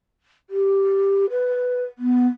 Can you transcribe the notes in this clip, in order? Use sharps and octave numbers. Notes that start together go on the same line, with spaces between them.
G4
B4
B3